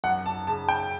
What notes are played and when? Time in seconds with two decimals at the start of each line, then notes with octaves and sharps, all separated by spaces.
0.04 F#2 F#5
0.26 A5
0.47 C#3 A5
0.69 G5